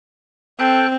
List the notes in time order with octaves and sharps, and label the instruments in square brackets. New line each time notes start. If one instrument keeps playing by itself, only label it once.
[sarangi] C4 [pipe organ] A4 G5 F#6